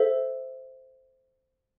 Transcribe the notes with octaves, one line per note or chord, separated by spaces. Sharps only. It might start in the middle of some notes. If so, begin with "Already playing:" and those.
Already playing: A4 C5 E5